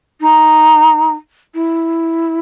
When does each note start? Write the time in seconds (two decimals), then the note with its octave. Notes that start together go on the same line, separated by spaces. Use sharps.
0.20 D#4
1.54 E4